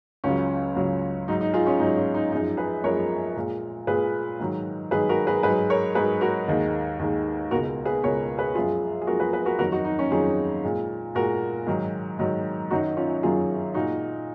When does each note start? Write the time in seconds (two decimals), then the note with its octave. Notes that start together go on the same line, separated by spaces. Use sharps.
0.24 C#2 C#3 F#3 C#4
0.76 C#2 C#3 F#3
1.28 G#2 F#3 D#4
1.41 D#4
1.54 F4 G#4
1.66 C#4 F4
1.79 G#2 F#3 D#4
1.97 C#4
2.14 D#4
2.31 F#2 F3 G#3 D#4
2.57 G#4 B4
2.84 F#2 F3 G#3 A#4 C#5
3.36 A#2 G#3
3.87 A#2 G#3 G#4 B4
4.40 G#2 D#3 F#3
4.91 G#2 D#3 F#3 G#4 B4
5.09 F#4 A#4
5.27 G#4 B4
5.43 G#2 G#4 B4
5.48 F#3
5.70 A#4 C#5
5.95 G#2 F#3 G#4 B4
6.21 F#4 A#4
6.48 D#2 D#3 G#3
6.99 D#2 D#3 G#3
7.51 C#2 B2 G#3 F#4 A#4
7.86 G#4 B4
8.03 C#2 B2 G#3 A#4 C#5
8.38 G#4 B4
8.55 F#2 F3 G#3 F4 G#4
9.02 G#4
9.07 F#2 F3 G#3 F#4 A#4
9.20 G#4 B4
9.33 G#4 B4
9.46 F#4 A#4
9.59 F2 D#3 F#3 F#4 A#4
9.72 D#4 F#4
9.85 D#4
9.99 C#4
10.11 F2 D#3 F#3 F4 G#4
10.64 A#2 G#3
11.15 A#2 G#3 F#4 A#4
11.67 G#2 D#3 F#3
12.19 G#2 D#3 F#3
12.71 F#2 D#3 F#3 D#4 F#4
12.97 C#4 F4
13.23 F#2 D#3 F#3 F4 G#4
13.74 A#2 G#3 D#4 F#4